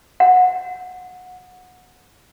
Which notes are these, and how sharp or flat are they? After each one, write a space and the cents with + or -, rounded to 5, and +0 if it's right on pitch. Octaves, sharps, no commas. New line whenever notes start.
F#5 -20